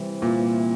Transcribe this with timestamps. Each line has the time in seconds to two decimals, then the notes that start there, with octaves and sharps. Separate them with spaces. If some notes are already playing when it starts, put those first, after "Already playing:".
Already playing: C3 E3 G3
0.22 A#2